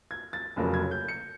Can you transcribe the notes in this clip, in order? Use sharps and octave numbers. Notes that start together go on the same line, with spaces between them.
G#6
A6
F1 F2 C#3 F#3 A#3
G#6
G6
C#7